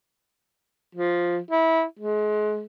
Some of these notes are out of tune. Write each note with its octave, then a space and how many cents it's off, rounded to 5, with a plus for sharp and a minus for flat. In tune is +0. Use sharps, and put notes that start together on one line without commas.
F3 +0
E4 -20
G#3 +30